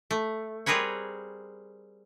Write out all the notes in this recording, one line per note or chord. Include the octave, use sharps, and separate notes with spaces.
A3
G3 C4 G#4 A#4 B4 C#5